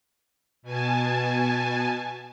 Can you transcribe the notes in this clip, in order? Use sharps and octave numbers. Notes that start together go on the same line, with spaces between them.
B2 G#5 A5